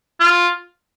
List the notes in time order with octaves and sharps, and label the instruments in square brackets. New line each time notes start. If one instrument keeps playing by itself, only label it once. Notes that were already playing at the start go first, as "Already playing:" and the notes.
[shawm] F4